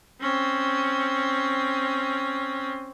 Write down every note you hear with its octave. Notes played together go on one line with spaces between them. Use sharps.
C4 C#4